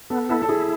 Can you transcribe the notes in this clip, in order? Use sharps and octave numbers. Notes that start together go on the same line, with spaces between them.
B3 A4
E4 A4
A4
E4 G#4